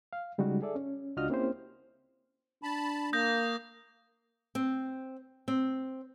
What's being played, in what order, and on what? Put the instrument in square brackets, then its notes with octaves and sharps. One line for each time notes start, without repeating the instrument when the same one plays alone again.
[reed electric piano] F5
C#3 G3 G#3 D#4 F#4
G#4 A4 D5 E5
C#4
C#2 D4 F4 F#4 D#5 F6
A#3 C4 C#4 E4 G4 C5
[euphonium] D4 [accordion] A5 B5
[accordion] A#3 [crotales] D#6 G6 A#6
[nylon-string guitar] C4
C4